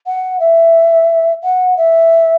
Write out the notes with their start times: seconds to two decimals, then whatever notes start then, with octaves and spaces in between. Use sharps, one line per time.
0.06 F#5
0.40 E5
1.43 F#5
1.77 E5